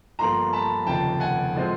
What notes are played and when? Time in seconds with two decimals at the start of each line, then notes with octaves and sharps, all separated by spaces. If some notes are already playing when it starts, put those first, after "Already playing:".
0.19 G1 G2 D3 F3 A#3 A#5 C6
0.53 A5 B5
0.86 F1 D#2 C#3 F3 G5 A5
1.20 F#5 G#5
1.55 A2 F3 G#3 C4